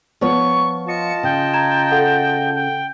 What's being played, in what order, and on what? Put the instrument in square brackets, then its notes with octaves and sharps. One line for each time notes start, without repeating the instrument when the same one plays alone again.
[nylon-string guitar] F3 B3 C#5 [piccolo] C#6
[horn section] F4 D#5 A5 [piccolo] C#7
[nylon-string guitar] C#3 [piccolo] G5
[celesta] A#5 G#6 E7
A4 F#5
[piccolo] G5